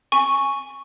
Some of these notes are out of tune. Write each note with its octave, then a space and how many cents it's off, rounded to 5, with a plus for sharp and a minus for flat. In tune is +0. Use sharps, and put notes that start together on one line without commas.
G#5 +0 C#6 +0